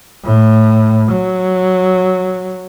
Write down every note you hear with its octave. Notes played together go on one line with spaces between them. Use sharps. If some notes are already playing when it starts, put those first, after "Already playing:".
A2
F#3